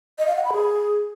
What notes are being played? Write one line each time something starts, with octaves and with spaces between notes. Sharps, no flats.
D#5
F5
F#5
B5
G#4